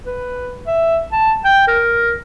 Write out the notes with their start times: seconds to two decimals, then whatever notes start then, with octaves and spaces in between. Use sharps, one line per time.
0.06 B4
0.67 E5
1.12 A5
1.45 G5
1.68 A#4